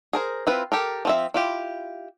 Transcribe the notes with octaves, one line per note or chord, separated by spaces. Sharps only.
G#4 A#4 C5
C4 E4 F4 B4
G4 A4 A#4
F3 C4 E5
E4 F4 G4